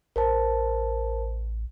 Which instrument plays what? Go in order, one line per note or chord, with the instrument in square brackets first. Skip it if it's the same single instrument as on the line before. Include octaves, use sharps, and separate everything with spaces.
[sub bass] A1 [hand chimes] A#4 C5 A5